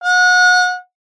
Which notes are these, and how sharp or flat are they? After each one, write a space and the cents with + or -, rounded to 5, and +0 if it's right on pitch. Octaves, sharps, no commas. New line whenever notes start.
F#5 -30